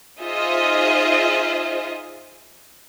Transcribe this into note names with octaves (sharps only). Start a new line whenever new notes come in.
D#4 F4 G#4 C5 D#5 E5